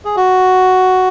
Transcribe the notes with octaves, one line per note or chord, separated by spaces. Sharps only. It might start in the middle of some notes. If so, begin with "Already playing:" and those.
G#4
F#4